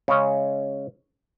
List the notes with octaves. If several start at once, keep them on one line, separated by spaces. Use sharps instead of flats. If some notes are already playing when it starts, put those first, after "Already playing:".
C#3 G#3 C#4